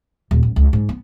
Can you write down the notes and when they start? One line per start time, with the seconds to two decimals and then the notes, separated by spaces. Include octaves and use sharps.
0.31 D#1
0.43 A1
0.56 C#2
0.73 G#2
0.89 B3